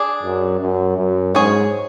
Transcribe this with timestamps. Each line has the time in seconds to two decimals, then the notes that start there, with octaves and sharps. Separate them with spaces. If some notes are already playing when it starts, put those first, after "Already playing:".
Already playing: D4 G#4 D5
0.23 F#2
0.61 F#2
0.98 F#2
1.34 G#2 C#4 G#4 C#5